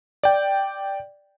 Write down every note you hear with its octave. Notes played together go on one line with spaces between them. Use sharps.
D5 G5